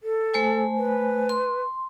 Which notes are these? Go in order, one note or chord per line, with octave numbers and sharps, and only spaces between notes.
A4
A3 C5 G#5
B4
C6